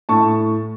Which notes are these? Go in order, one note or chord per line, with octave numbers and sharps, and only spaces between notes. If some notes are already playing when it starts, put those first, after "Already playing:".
A2 A5 C#6